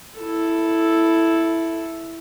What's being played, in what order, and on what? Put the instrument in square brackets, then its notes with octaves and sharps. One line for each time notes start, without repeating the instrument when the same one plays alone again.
[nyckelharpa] E4 A4